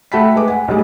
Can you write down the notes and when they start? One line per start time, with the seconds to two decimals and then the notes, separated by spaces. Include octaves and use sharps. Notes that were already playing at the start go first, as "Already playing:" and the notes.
0.12 A3 F#4 G5 A5 B5 B6
0.35 G#3 B4 D6
0.48 F#5 G#5
0.68 B1 A2 G3 G#4